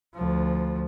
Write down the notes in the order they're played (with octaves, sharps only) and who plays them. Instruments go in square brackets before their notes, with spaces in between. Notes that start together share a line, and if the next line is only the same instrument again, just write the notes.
[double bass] D2 F3